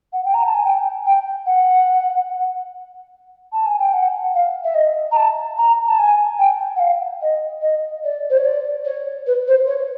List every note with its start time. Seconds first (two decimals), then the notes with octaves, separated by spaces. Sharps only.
0.13 F#5
0.24 G5
0.34 A#5
0.45 A5
0.54 G#5
0.64 G5
1.06 G5
1.46 F#5
3.53 A5
3.66 G#5
3.79 G5
3.93 F#5
4.35 F5
4.64 E5
4.75 D#5
5.11 A#5
5.16 A5
5.58 A#5
5.87 A5
5.99 G#5
6.39 G5
6.76 F#5
6.80 F5
7.22 D#5
7.62 D#5
8.04 D5
8.30 C5
8.37 C#5
8.45 D5
8.85 C#5
9.27 B4
9.48 C5
9.67 C#5